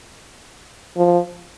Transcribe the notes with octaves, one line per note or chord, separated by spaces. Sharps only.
F3